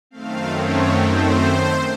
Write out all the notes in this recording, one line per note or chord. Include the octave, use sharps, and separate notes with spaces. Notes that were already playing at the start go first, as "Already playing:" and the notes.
F#2 D#3 A3 C4 F5
C#5
C5